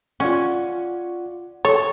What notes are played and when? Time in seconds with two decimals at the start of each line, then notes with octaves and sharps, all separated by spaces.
0.20 C#4 F4 D5 F#5
1.65 A4 C#5